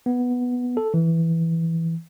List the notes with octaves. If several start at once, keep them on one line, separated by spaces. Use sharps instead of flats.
B3
A4
E3